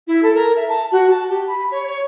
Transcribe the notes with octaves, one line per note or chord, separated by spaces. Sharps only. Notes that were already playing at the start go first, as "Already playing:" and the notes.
E4
A4
A#4
E5
A5
F#4
A5
G4
B5
C#5
C#5